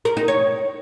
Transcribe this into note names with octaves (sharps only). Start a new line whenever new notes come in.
A#4
D#4
C#5